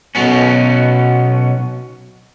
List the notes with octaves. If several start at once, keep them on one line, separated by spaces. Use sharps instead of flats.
B1 B2 F#3 B3 C#4